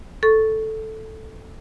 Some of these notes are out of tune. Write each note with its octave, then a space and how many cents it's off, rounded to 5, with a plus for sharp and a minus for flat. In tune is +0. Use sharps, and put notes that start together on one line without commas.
A4 +0 C#6 +0